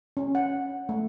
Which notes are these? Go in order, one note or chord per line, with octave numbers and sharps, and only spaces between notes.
C#4
F#5
A3